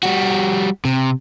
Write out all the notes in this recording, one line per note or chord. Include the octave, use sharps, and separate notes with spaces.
G3 F#4
C3